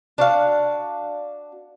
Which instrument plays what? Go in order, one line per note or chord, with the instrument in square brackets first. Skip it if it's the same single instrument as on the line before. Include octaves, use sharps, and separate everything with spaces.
[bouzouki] D4 F#4 F5